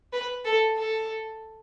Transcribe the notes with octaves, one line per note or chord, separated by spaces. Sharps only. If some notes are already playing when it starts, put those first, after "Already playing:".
B4
A4
A4